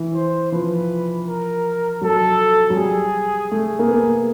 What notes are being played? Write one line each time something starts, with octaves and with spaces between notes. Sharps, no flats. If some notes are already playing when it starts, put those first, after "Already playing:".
Already playing: E3
C5
F3 B4
A#4
F#3 A4
F#3
G3 G#4
A3 G#4
A#3
B3